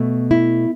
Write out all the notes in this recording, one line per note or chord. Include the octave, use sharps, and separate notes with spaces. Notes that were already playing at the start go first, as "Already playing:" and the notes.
Already playing: B2 A3
E4